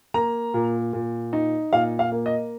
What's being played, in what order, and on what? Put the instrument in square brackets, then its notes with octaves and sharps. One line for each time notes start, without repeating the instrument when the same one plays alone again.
[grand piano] A#3 A#5
A#2
A#2
D#4
A#2 F5
F5
A#3
D#5